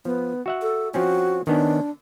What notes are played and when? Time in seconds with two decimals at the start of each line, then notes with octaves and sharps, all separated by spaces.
0.05 F3 B3
0.46 F#4 E5 F#5
0.62 A4
0.94 F3 C4 C#4 F#4
1.47 D#3 B3 C#4 D4